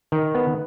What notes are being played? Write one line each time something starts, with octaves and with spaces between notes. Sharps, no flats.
D#3
B3